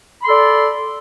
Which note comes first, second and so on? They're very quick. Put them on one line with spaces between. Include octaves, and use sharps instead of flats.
B5 C6 A4 D5